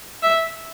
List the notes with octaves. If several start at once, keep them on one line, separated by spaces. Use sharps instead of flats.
E5